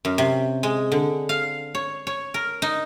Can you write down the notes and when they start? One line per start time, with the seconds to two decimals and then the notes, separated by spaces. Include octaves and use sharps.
0.05 F#2
0.18 C3
0.63 G#3
0.92 D3
1.29 F5
1.75 C#5
2.07 C#5
2.34 A#4
2.62 D#4